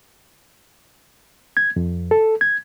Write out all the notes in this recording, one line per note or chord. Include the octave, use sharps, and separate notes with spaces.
G#6
F2
A4
G#6